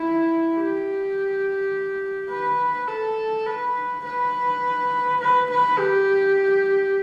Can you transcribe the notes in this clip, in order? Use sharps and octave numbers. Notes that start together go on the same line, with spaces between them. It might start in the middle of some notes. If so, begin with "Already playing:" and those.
Already playing: E4
G4
B4
A4
B4
B4
B4
B4
G4